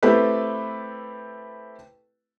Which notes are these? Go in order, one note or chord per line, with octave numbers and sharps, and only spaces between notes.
A3 C4 E4 G4 A4 B4